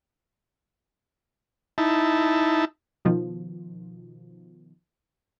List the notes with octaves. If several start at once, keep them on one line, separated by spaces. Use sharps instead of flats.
D#4 E4 A5
B2 D#3 F3